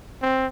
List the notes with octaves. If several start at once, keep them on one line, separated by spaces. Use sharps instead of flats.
C4